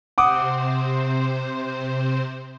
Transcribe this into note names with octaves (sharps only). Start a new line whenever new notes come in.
C3 C4 C5 F#5 D6 D#6